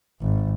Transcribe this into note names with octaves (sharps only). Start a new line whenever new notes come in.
G#1